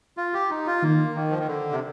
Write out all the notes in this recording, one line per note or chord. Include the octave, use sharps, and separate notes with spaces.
F4
G4
D#4
F4
D#3 A#3
D#3
F3
D#3
D3
C3